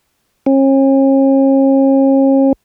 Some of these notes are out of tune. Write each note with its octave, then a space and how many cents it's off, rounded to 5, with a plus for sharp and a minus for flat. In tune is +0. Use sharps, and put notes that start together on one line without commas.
C#4 -40